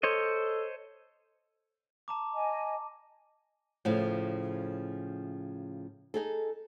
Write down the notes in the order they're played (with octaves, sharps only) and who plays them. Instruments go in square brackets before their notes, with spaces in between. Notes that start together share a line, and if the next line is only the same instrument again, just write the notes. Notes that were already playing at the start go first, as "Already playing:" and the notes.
[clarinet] A4 [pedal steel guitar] C5 C#5 D#5
[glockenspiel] A5 A#5 D6
[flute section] D#5 G#5
[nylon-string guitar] A2 C#3 F3
D#4 G#4 A4